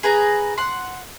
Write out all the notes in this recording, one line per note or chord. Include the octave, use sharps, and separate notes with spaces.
G#4 B4 A#5
F#5 C6